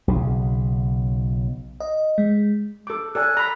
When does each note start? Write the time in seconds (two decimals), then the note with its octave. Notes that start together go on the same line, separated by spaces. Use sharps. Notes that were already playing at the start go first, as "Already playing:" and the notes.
0.08 B1 C#3
1.80 D#5
2.18 G#3
2.87 A4 D6
3.15 A4 D5 G#5 F#6
3.35 D5 A#5 B5